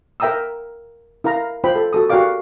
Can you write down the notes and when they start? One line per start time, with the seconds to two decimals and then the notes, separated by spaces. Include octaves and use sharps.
0.20 A#4 E5 G5 A#5 D#6 E6
1.24 E4 A#4 F5 A#5
1.64 F4 C5 G5 B5
1.75 A4
1.93 F#4 A4 D#6
2.09 F#4 G4 A#4 D5 F5 D6